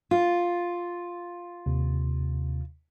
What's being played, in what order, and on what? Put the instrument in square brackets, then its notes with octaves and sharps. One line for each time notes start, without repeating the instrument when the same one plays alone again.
[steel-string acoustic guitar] F4
[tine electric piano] D#2 C3